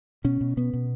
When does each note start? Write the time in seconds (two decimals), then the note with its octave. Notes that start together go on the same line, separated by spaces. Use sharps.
0.24 B2 C#4
0.41 B2
0.57 B2 B3
0.73 B2